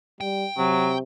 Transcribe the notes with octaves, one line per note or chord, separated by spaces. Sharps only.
G3 G5
C3 F#3